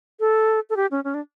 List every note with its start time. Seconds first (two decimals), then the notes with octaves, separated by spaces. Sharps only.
0.20 A4
0.70 A4
0.76 G4
0.91 C#4
1.04 C#4
1.14 D4